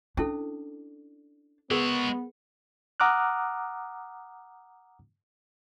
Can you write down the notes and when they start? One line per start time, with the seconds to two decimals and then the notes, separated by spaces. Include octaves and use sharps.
0.17 C#4 D4 E4 A4
1.71 G#3 B3 G#4 A#4 C#5
3.00 F#5 A#5 D6 D#6 F6 F#6